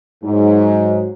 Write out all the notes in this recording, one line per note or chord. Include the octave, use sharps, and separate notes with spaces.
G#2 F#3